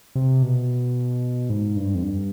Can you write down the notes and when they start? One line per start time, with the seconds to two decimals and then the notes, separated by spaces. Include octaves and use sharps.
0.15 C3
0.43 B2
1.50 G#2
1.76 G2
1.95 F2
2.03 G2